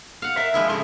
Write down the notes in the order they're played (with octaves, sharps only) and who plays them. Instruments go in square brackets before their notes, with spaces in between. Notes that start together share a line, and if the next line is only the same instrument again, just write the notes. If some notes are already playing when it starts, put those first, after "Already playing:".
[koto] F5 F#5
[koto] A#4 [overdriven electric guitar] E5
[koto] F3 G#3 E4
[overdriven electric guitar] C#3 C6 [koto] G#3 A3 E4